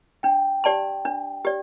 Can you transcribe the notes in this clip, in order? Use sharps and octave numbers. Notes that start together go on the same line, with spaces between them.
D4 G5
G4 D5 A5 C6
D4
G4 D5